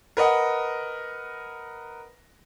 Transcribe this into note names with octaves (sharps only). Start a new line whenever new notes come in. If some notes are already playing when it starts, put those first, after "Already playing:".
A#4 B4 D#5 F#5